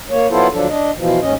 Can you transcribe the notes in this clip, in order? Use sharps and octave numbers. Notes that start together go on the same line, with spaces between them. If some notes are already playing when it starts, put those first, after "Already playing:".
A#3 C#5
F#3 B3 E4 F4 A4 C5
D2 F3 F#3 D4 A4
D4 D#5
B2 E3 F3
D#2 G#2 C#4 D#5